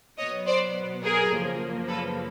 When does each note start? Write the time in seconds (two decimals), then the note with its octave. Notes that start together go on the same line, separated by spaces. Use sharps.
0.18 B2 F#3 B3 C#5 D#5
0.46 C5 D5
1.03 G#4 A#4
1.32 F#2 C#3 F3 A#3
1.88 A4 B4